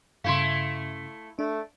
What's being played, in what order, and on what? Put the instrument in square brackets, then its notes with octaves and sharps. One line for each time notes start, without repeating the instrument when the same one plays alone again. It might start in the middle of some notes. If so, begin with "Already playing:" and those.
[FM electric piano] G2 C#3 [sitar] A3 E4 [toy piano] F5 C6
[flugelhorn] A3 [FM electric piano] D4